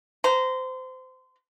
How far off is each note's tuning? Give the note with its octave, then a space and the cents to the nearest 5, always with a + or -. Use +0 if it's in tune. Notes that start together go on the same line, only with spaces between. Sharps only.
C5 -25 A#5 +0